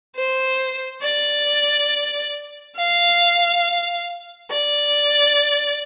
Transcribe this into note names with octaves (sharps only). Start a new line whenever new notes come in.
C5
D5
F5
D5